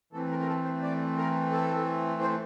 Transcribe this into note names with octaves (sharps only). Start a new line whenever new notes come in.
E3 A3 C4 A4
A#4
A#4
A4
C5
D5
A#4
A4
C5